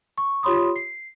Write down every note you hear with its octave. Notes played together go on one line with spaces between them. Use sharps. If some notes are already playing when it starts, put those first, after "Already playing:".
C#6
F4 G4 C#5 B5 C6 D#6
C7